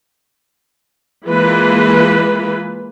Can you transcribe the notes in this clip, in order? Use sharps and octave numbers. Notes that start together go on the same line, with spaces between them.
E3 G#3 A#3 F4 B4